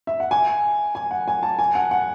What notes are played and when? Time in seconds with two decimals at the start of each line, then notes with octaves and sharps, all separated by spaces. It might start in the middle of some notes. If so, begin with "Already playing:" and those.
0.07 E5
0.20 F#5
0.31 G#5
0.95 G#5
1.11 F#5
1.28 G#5
1.43 A5
1.59 G#5
1.75 F#5
1.91 F#5